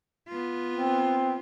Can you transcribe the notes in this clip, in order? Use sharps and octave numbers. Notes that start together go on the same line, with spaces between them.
B3 F4
C4